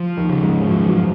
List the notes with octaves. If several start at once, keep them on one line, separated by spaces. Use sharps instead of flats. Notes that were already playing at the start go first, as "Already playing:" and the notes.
Already playing: F3
D#2 D#3
C#3
G#2 G#3
F#2 F3 F#3
F#2 F#3